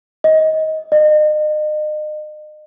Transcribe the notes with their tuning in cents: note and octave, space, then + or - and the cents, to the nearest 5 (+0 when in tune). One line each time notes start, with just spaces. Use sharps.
D#5 +20
D#5 -35